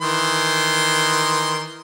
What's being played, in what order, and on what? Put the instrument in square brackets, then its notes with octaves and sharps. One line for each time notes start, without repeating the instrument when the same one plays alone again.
[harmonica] D#3 E3 C6